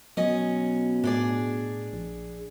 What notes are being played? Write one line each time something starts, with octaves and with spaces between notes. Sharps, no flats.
B2 F#3 C#4 D#5
A2 D4 G#4 D5
A#1